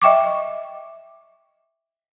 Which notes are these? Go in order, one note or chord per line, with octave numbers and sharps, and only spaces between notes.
D#5 E5 G5 C#6 D6